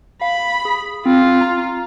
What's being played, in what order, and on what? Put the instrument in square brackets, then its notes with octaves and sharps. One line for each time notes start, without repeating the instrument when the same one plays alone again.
[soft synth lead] F5 [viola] B5
[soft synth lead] G#4
[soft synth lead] C4 [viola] F4
[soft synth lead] A#5